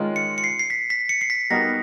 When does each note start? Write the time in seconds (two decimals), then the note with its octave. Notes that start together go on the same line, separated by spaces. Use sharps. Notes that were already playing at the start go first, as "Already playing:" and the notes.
Already playing: D#3 G#3 C#4 F4
0.16 C#7
0.38 C#7
0.44 C7
0.59 C7
0.70 B6
0.90 B6
1.09 C#7
1.21 C7
1.30 B6
1.50 G3 B3 D#4 F#4 A#4 A#6